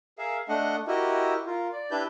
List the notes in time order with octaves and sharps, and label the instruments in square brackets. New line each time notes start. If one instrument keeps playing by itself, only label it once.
[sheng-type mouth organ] G#4 A#4 E5 F5
A3 D4 D#5 F#5
E4 F#4 G4 A#4 D#5
F4 A#4
D5
D4 E4 G4 B4 G6